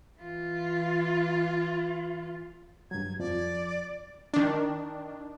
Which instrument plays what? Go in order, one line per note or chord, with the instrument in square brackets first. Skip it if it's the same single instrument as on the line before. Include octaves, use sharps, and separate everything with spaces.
[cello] E3 F4
[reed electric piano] G2 F#3 [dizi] G#6
[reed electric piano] F2 F3 [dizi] D5
[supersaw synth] D#3 D4